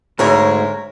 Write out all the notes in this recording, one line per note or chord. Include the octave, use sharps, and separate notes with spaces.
D2 G#2 A#4 C#5